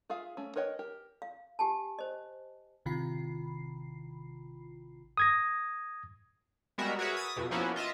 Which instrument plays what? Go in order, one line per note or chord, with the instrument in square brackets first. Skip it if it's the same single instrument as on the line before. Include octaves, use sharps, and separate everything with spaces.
[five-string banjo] F4 G#4 E5 F5
A3 C#4
A#4 B4 C#5 D#5 G5
G4 A#4
[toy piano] F5
G4 G#5 A5
C5 D#5
[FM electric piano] A1 C3 D#3 F4 B5 C7
[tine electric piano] D#6 G#6 A#6
[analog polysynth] G3 G#3 B3 F#4 A#4 E5
F#4 G#4 A#4 B4 C#5 E5
D#6 G#6 A6 B6
F2 B2
F3 A#3 B3 C#4 E4 F#4
F4 D#5 E5 A6